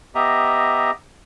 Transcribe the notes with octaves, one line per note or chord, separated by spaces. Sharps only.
B3 G4 D#5 E5 A#5